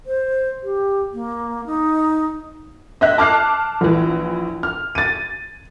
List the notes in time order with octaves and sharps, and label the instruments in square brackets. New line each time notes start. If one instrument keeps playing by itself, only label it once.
[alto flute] C5
G4
A#3
D#4
[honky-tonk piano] D#5 E5 F#6
A5 D6 F6 F#6 C7
A#1 E3
F6
A6 D#7